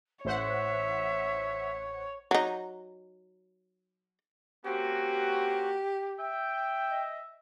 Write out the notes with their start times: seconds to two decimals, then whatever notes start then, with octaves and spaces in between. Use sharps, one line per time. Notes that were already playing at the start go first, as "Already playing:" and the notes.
0.25 A1 C5 C#5 E5 F#5
2.31 F#3 D#4
4.66 A#3 C4 C#4 F#4 G4
6.19 E5 G5
6.91 D#5